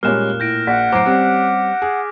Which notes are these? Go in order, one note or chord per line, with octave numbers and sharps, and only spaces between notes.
A#2 G3 G#3 A#3 C#4 F6 F#6 E7
A2 G6 A#6 D7
A#1 F#5 B6
F#2 A2 C5 A#5 D6 A#6 C7 D7
G3 C4 C#4 G4
G#4